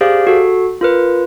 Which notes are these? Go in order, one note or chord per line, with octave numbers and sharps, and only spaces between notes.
G4 G#4 C5 D5 F5
F#4 A4
F4 A#4 B4